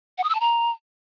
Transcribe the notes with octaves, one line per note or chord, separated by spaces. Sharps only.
F#5
D#6
E6
A5
A#5